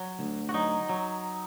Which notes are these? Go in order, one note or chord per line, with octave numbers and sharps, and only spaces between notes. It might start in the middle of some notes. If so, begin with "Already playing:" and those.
Already playing: F#3
D2
F#4
F#3 D#4
F#3